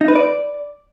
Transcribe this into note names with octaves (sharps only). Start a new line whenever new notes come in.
D#4
B4
D5